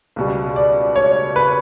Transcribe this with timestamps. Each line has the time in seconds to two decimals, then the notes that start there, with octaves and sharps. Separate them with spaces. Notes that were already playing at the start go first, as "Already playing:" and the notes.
0.16 C#2 B2 G3
0.56 D5
0.96 C#5
1.36 B4